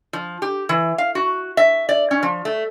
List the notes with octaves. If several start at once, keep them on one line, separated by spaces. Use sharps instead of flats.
F3
G4
E3
F5
F#4
E5
D5
C#4
F3
A3